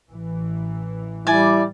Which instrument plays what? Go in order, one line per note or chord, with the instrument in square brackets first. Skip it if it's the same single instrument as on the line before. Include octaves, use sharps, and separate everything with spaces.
[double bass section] A1 E3
[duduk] G3 [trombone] E4 [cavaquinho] D5 G#5